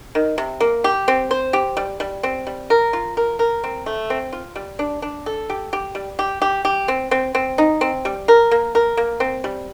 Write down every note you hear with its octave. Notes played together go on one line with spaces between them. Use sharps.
D#3
C3
A#3
G4
C4
C5
G4
G3
G3
C4
G3
A#4
F4
A#4
A#4
C4
A3
C4
F4
G3
D4
D4
A4
G4
G4
G3
G4
G4
G4
C4
C4
C4
D#4
C4
G3
A#4
A#3
A#4
A#3
C4
G3